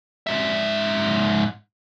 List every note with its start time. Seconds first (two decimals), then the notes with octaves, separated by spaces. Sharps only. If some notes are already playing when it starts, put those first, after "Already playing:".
0.27 G#2 E5